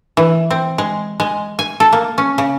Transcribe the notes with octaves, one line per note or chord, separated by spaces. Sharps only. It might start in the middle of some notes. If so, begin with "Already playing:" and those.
E3
C4
G#3
G#3
G#5
A4
A#3
C#4
C#3